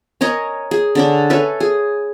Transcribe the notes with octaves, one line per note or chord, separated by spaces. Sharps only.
C#4 A#4 C#5 D#5
G#4
D3 C#4 D4
C#4 A4 B4 E5
G#4